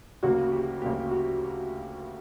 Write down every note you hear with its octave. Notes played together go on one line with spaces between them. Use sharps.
D2 C#3 F#3 A#3 F#4
G4
D2 C#3 F#3 A#3 G4
F#4